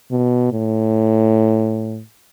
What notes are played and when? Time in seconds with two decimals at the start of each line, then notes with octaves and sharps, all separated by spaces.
0.11 B2
0.52 A2